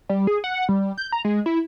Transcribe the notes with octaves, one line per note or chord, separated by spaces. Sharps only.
G3
G#4
F#5
G3
G6
A#5
G#3
E4